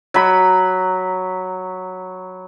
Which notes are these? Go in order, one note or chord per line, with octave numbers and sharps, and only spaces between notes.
F#3 B5